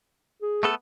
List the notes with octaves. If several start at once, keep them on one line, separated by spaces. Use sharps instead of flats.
G#4
A3 B3 A4